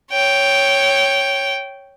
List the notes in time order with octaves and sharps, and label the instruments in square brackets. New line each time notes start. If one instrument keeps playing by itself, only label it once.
[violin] C#5 G5